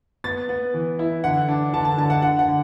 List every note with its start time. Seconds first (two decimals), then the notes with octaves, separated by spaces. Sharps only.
0.24 B3 A6
0.49 B3
0.74 E3
0.99 E4
1.24 D3 F#5
1.48 D4
1.73 D3 A5
1.85 A5
1.98 D3 A5
2.10 F#5
2.22 D3 F#5
2.39 F#5
2.48 D3